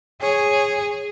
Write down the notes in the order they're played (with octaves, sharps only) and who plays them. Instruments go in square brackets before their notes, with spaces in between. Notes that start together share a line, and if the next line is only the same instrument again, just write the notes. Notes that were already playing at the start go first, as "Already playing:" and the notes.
[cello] G#4 [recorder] C#5